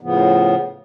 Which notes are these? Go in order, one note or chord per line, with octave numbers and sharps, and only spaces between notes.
A2 C#3 F3 B3